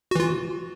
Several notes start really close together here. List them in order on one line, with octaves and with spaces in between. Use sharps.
F#4 E3 F4